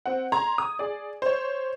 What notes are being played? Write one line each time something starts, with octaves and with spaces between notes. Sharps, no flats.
C4 F#5
A#5 C6 G#6
D#6
G#4 D5
C5 C#5